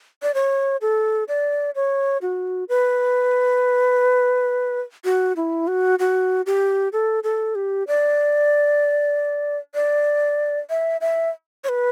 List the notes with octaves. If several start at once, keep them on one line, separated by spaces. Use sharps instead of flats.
D5
C#5
A4
D5
C#5
F#4
B4
F#4
E4
F#4
F#4
G4
A4
A4
G4
D5
D5
E5
E5
C#5
B4